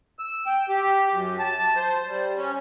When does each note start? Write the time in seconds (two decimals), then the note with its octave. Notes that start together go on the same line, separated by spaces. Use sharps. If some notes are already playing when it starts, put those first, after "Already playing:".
0.19 E6
0.46 G5
0.69 G4
1.11 F#2
1.39 A5
1.76 C5
2.08 G3
2.37 C#4